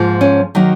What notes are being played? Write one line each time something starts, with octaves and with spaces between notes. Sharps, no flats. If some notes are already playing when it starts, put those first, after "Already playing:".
Already playing: G#2 F3 A#3
C#4
D#3 F#3 A#3